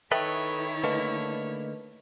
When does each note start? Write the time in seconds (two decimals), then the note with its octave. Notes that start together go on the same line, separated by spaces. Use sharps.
0.11 D#3 E4 A4 B4 C#5 D#5 E5 G5
0.84 D3 A3 A#3 B4 D#5